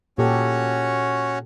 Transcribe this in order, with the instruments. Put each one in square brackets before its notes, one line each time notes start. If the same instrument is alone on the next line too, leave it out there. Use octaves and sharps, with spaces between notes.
[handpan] A#2 G4 A4 [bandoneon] C#4 F#4 C#5